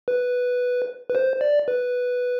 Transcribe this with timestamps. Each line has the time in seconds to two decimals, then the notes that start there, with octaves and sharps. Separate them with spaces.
0.08 B4
1.10 B4
1.15 C5
1.41 D5
1.68 B4